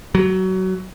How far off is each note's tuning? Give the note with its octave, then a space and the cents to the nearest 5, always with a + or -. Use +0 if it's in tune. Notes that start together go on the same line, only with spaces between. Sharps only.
F#3 +20